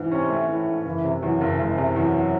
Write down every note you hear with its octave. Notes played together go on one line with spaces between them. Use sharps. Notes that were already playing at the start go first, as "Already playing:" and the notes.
Already playing: G#2 E3
C3 C#4
A3
A2 E3
G#2
F#1 E3
C3
E2 F#3
F#1
F#1 G#3
C3
E2 F#3